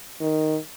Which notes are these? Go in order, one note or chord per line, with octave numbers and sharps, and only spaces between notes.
D#3